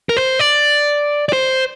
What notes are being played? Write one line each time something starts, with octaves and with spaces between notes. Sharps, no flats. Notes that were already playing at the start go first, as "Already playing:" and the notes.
A#4
C5
D5
D5
C5